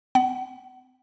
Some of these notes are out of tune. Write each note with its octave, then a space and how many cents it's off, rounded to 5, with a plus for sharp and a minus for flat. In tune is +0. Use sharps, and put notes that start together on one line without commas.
C4 -45 F#5 +35